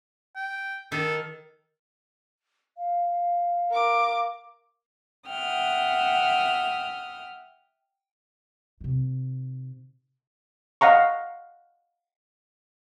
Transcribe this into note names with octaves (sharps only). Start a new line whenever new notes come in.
G5
D#3 A4
F5
A#4 D6
E5 F#5 G5 D#6 F6
C3 D#3
D#5 F5 F#5 A#5 C#6